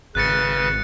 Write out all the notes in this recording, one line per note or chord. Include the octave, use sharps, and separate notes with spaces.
G#1 C#3 B4 F#6 A6 C#7